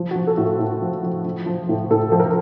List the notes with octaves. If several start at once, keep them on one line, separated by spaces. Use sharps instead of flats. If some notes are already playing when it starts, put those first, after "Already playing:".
Already playing: F3
F#4
F3
A4
A2 F#4
F4
A2
F3
F3
F3
F3
A2
A2 A4
F3 A4
A#4